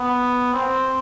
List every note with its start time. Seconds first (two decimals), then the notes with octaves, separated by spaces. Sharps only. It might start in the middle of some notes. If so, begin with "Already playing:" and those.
Already playing: B3
0.54 C4